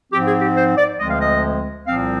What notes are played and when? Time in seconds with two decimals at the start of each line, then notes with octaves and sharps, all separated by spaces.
0.12 G#2 F3 C4 G4
0.27 G#4
0.41 G4
0.56 C5
0.77 D5
0.99 D2 D3 F3 G#3 C4 D#5
1.09 F5
1.19 D#5
1.87 C2 A#2 F3 C4 F5